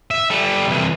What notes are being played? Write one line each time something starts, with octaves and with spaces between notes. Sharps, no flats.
E5
G3 A4
C2 E3